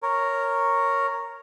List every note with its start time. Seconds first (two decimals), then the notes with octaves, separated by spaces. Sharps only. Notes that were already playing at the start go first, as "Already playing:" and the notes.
0.03 A#4 C#5